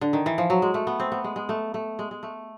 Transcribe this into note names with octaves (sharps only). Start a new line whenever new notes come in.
D3
D#3
E3
F3
F#3
G#3
A3
B3
C4
B3
G#3
G#3
A3
A3
G#3
G#3
A3